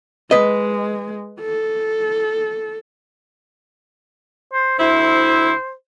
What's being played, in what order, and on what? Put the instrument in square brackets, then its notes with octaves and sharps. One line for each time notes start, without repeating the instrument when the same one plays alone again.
[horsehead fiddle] G#3 [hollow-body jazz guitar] B4 D#5
[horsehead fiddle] A4
[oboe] C5
[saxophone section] D2 C4 E4 [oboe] C5